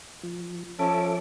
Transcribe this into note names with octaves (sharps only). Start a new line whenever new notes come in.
F3
F3 C#4 A4 E5 A5 D6